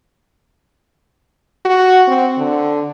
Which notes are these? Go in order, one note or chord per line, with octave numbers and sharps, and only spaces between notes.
F#4
C4
D3